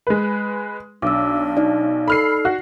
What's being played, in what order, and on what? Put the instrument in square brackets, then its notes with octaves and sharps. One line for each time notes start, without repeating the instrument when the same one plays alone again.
[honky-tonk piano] G#3 B4
[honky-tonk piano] B1 [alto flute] D4 [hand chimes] D6 E6
[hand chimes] D#4 D5
[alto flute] A4 [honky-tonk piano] B5 F6 C7
[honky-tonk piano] F#4